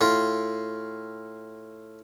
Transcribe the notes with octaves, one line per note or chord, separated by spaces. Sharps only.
A2 F4